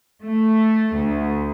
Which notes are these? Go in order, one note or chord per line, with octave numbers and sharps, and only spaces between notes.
A3
D2